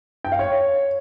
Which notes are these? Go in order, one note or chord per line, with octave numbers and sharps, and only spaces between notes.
G5
F5
C#5